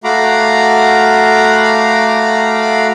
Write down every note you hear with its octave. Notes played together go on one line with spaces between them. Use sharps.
A3 F#4 F5 A#5 B5 D6